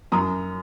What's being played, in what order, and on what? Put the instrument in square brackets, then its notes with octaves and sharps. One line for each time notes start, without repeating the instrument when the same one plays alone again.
[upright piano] F#2 A#5 D#6